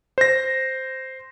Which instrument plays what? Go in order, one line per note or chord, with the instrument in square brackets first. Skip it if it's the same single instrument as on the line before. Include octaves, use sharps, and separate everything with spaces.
[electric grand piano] C5 A#6